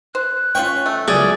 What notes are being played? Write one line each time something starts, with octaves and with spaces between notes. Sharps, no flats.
C5 F#6
C#4 F4 C#5 G5 B5 C#6
A3
C#2 F#2 G#4 D5